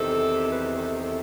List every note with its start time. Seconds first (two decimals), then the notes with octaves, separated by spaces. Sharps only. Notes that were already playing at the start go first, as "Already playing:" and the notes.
Already playing: E2 C3 D#3 A4
0.51 B4
0.75 A4
0.98 A4